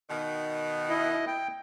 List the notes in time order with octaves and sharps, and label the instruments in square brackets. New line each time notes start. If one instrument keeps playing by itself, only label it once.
[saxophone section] B2 D#3
[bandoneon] E4 D#5
G5